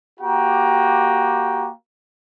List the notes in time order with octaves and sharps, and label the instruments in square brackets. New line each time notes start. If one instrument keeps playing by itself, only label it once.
[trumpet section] A#3 F#4 G4 G5 A#5